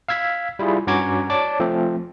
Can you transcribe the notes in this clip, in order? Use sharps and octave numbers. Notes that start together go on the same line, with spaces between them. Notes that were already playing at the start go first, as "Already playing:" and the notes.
F5 E6 G#6 B6
G3 E4 F4 G#4
G2 C#4 F#4 A#5 D6 G#6
C#5 D5 A5 D6
F3 A3 C4